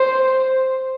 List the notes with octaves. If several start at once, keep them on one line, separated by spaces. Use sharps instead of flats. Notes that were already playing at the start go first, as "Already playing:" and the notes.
Already playing: C5